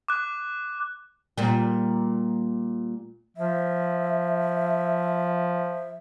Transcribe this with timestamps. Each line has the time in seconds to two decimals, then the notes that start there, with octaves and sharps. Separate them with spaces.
0.08 D6 F#6
1.38 A#2 G3
3.37 F3 E5